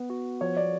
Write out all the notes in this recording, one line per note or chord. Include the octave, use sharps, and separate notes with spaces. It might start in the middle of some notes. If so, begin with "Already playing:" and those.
Already playing: B3
F#4
F3 C#5
D5